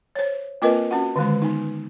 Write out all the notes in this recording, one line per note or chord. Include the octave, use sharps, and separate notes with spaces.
C5 C#5
A#3 C4 F4 A#4 B4 D#5
C#4 F#4 F#5
D3 D#3 G#3 C5
B3 D#4